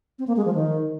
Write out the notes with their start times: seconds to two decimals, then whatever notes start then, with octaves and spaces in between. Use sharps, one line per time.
0.19 C4
0.27 A#3
0.37 G#3
0.46 F3
0.55 D#3